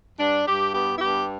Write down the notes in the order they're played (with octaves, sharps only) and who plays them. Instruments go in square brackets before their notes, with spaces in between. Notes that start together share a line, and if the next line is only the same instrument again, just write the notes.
[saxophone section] G2 D4
G2 G4
B3 G4
E4
G2 G4